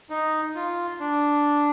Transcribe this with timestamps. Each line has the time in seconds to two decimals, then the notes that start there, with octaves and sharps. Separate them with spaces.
0.10 D#4
0.56 F4
1.00 D4